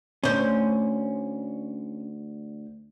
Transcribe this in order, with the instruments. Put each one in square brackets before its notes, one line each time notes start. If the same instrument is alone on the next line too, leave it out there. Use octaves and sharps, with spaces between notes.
[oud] D2 C5 [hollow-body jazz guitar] C#4